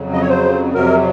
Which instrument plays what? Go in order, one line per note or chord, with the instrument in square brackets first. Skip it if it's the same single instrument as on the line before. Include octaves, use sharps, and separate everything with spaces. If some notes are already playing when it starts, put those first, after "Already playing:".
Already playing: [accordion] F2 C#3 F#3
D#5
C#5
C5
F2 C3 F#3 A#4